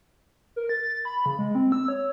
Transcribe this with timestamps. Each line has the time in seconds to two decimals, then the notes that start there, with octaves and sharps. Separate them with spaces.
0.56 A#4
0.69 A6
1.05 B5
1.26 C#3
1.39 G#3
1.55 C4
1.72 E6
1.88 C#5